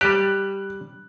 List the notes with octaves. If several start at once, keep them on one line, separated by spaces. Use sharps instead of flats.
G3 G4 F#6